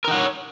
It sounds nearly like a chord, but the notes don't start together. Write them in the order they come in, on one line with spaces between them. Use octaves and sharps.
A#4 D#4 F#5 C#5